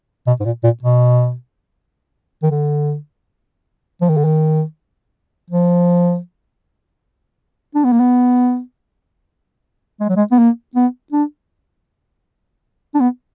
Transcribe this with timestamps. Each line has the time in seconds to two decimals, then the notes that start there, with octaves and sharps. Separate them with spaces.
0.27 B2
0.40 G#2
0.45 A#2
0.64 A#2
0.82 B2
2.43 D#3
2.51 D3
4.01 F3
4.09 D#3
4.17 D3
4.25 D#3
5.50 F3
7.75 D4
7.84 B3
7.92 A#3
8.00 B3
10.00 G#3
10.09 F#3
10.16 G#3
10.31 B3
10.38 A#3
10.75 B3
11.12 D4
12.94 D4
13.00 B3